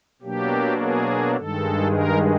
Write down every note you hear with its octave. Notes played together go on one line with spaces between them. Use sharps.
B2 F#3 A#3 D4 G4
G#4
G2 D#3 G#3 A4
A#4